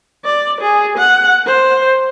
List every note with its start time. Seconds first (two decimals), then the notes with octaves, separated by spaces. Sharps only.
0.25 D5
0.61 G#4
0.98 F#5
1.46 C5